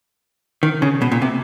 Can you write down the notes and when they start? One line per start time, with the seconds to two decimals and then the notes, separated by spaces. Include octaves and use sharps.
0.63 D#3
0.82 C#3
1.02 B2
1.12 A#2
1.22 C3